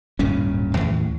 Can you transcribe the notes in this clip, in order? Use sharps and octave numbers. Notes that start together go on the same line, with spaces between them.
D1 G2 A#2 C#4
D#2 A2